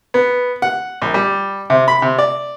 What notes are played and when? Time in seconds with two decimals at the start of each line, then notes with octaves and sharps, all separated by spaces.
0.14 B3
0.62 F#5
1.02 A#1
1.14 G3
1.70 C3
1.88 B5
2.02 C3
2.19 D5